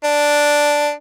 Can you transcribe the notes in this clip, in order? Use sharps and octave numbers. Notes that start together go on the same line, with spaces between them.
D4